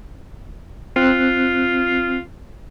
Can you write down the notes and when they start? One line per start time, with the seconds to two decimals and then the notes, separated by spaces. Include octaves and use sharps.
0.96 C4 F4 F#6